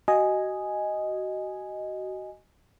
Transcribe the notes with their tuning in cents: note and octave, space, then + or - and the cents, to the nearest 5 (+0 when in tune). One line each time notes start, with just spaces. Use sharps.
F#4 +25 D#5 +0 G#5 +0